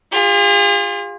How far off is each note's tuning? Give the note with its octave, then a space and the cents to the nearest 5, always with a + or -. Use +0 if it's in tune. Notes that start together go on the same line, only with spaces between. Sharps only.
F4 +10 G#4 -45